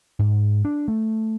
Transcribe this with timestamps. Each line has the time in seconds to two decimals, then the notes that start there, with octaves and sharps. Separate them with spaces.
0.19 G#2
0.65 D4
0.88 A3